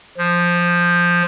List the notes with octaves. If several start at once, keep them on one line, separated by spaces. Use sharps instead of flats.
F3